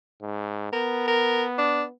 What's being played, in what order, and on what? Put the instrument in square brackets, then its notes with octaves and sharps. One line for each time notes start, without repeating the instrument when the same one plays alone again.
[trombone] G#2
[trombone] B3 [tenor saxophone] A#4
[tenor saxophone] A#4
D4